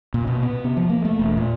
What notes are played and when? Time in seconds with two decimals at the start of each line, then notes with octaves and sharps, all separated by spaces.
0.14 A#2
0.27 B2
0.43 B3
0.64 C3
0.77 F3
0.89 A#3
1.05 A3
1.19 E1
1.37 A#2